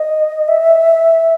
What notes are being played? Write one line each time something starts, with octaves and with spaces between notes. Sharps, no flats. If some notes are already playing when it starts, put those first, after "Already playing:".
Already playing: D#5
E5